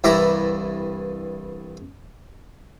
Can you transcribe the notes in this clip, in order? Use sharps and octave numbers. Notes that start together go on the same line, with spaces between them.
C2 G2 E3 E5 A#5 D6